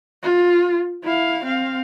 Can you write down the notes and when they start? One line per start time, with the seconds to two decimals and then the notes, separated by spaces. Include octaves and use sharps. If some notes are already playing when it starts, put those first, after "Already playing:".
0.23 F4
1.03 E4 F5
1.44 C4 F5